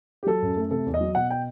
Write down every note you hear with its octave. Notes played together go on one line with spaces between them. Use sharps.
G4
F#3 A4
F#2
A3
C3 A4
E2
D#5
F#3
B2 F#5
G5